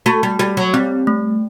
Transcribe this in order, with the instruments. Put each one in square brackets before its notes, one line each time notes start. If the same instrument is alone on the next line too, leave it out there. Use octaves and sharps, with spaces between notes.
[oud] A3 [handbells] F#4
[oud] G3
[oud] G3 [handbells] F#4
[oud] F#3
[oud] G3 [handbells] C4
[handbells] A3